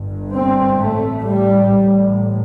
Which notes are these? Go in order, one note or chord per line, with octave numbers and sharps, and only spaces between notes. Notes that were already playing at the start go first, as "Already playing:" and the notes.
Already playing: G1 G2
C4
A1 A2 A3
G3
A1 A2